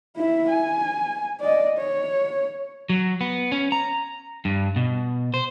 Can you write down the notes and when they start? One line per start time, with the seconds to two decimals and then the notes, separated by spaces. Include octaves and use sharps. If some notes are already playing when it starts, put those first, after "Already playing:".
0.17 E4 E5
0.48 G#5
1.41 D5 D#5
1.78 C#5
2.89 F#3
3.21 B3
3.52 C#4
3.72 A#5
4.45 G2
4.76 B2
5.34 C5